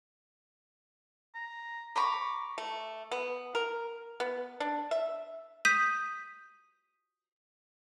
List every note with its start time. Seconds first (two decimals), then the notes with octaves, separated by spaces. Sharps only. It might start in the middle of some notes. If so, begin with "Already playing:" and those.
1.35 A#5
1.96 A#5 B5 C#6 D6
2.58 A3
3.11 B3
3.55 A#4
4.20 B3
4.60 D4
4.91 E5
5.65 D#6 G6 B6 D#7